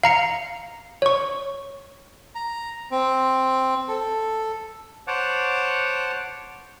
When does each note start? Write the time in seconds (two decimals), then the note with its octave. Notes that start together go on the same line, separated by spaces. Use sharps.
0.03 F5 A#5 C#7
1.02 C#5 C#6
2.35 A#5
2.91 C4
3.88 A4
5.07 C5 C#5 F#5 A5 D6